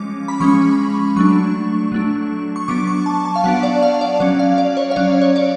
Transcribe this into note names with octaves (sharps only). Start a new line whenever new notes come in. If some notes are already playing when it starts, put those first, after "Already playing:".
Already playing: F3 G#3 C#4 D6
B5
F3 G#3 C#4 C#6
F#3 A3 D4 C#6
F#3 A3 D4
C#6
F#3 B3 D4 D6
C#6
A5
A5
F5
F#3 B3 D4 F#5
D5
F5
D5
F#3 C#4 D5
F5
D5
C#5
F5
F#3 C#4 D5
C#5
D5